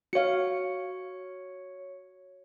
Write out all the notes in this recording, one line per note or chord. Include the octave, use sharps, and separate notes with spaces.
F#4 C#5 F5 C#7